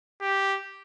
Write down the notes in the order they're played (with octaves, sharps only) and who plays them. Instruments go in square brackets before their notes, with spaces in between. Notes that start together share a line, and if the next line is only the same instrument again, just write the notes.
[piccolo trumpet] G4